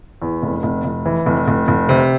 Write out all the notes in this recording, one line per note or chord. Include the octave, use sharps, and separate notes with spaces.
E2
F1
F1
F1
E3
F1
F1
F1
C3